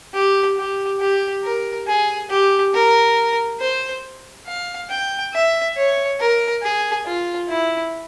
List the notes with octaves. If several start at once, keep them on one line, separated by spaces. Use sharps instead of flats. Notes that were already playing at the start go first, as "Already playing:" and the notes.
G4
G4
G4
A#4
G#4
G4
A#4
C5
F5
G5
E5
C#5
A#4
G#4
F4
E4